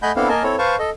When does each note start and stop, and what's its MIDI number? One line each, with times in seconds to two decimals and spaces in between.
0.02 0.12 57
0.02 0.12 75
0.02 0.12 78
0.02 0.12 80
0.02 0.12 83
0.02 0.12 91
0.16 0.28 59
0.16 0.28 60
0.16 0.28 62
0.16 0.28 64
0.16 0.28 69
0.16 0.28 77
0.29 0.43 58
0.29 0.43 70
0.29 0.43 75
0.29 0.43 80
0.29 0.43 81
0.43 0.56 60
0.43 0.56 64
0.43 0.56 69
0.43 0.56 73
0.59 0.76 71
0.59 0.76 72
0.59 0.76 77
0.59 0.76 81
0.59 0.76 85
0.79 0.90 69
0.79 0.90 75